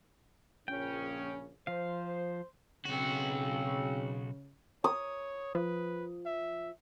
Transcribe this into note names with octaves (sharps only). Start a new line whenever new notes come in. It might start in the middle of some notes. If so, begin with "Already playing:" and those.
A#1 C#3 C#4 G5
F3 C5 F5
B1 C#3 C4 F#4
C#5 D#6
F3 B4
E5